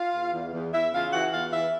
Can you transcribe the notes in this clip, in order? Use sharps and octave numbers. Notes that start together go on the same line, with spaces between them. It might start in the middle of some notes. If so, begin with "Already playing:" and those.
Already playing: F4 F5
E2
E2
E2
E2 E4 E5
C#3 F4 F5
E3 F#4 F#5
E2 F4 F5
E3 E4 E5